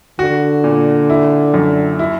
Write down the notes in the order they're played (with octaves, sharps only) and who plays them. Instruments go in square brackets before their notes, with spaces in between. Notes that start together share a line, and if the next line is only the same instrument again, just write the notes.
[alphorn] D3 [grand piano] F#4
[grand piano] A#2
E4
F#2
E4